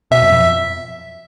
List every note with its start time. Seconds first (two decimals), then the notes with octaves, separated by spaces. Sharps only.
0.11 B2 E5
0.21 F#2
0.31 F2